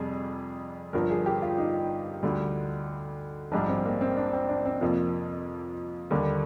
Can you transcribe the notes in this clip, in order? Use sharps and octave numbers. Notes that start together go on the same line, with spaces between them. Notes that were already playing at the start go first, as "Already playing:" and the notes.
Already playing: F2 C3 G3 G#4
G1 G2 F3 A#4
G#4
G4
F4
D#4
D2 D3 G3
A#1 G#2 G3 D4
C4
A#3
C4
D4
C4
D4
C4
F2 C3 F3 A#3
D#2 D3 G3 A#3